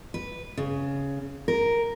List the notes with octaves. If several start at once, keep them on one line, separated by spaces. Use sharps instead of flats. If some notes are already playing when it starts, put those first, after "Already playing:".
B4
C#3
A#4